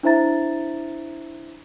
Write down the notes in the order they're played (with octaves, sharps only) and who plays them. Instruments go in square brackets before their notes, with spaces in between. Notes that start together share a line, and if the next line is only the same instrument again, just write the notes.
[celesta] D4 E4 C5 E5 A#5 A6